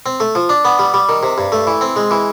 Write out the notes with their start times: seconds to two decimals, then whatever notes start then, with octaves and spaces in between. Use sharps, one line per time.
0.06 C4
0.20 A3
0.35 F3
0.49 D4
0.65 B3
0.79 G3
0.94 G3
1.09 D#3
1.23 C3
1.38 G2
1.52 A3
1.67 E3
1.81 C4
1.96 G#3
2.11 E3